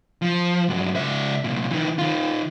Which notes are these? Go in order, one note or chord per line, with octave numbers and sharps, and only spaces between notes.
F3
G2 F#3
C#2 E5
C2 A#2
D#3 E3
D#3 F4